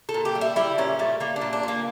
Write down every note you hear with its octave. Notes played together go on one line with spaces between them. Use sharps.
A4
A#2
G4
G3
E4
G3 E4
A#2 C#4
G3 A3
G3 A#3
D4
A#2
D4
A#2 A#3